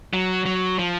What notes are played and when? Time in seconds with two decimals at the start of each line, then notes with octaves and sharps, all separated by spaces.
0.13 F#3
0.46 F#3
0.79 F3